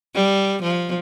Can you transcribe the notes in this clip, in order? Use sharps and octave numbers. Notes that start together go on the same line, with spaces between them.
G3
F3